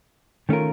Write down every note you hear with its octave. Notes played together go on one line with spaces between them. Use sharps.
D#3 A3 C#4 F4 A#4